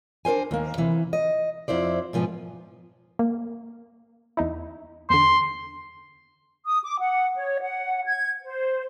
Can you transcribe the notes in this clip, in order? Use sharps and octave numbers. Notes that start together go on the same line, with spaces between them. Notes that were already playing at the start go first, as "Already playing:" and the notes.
D4 A#4 C5 G#5
D#2 A#3
C3 E3
D#5
F2 E4 C5 D5
G#2 B2 F3 B3 G#5
A#3
E2 D#4 E4
E2 D3 C6
D#6
D6
F#5
C#5
F#5
G#6
C5